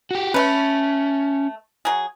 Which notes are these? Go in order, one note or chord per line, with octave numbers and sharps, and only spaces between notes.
F#4 G4
A3 C#4 B4
F#3 G#4